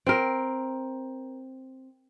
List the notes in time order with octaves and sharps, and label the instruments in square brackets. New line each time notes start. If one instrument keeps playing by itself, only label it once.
[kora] C4 A#4